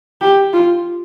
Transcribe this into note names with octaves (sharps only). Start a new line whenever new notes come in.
G4
F4